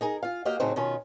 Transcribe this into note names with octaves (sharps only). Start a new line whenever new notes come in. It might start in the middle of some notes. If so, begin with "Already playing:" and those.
D#4 G#4 A#4
F4 F5
A#3 F#4 G4 D#5 F5 G5
A2 C#3 F#3 C4 D#4
B2 D#3 C#4 F4